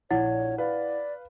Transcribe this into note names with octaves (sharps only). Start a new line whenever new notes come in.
A#1 E4 C#5 F#5
B4 D5 F5